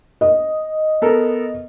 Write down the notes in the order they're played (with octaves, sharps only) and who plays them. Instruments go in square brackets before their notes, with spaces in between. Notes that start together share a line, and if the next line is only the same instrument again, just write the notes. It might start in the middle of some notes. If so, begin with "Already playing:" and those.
[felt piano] D#5
[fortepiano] B3 A4 A#4